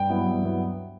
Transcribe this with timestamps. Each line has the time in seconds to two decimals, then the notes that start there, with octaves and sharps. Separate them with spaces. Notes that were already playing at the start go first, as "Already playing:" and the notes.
Already playing: G2 G5
0.10 F#3 B3 E4
0.26 G2
0.43 F#3 B3 E4